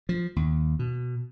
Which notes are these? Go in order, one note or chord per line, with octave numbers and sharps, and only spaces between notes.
F3
D#2
B2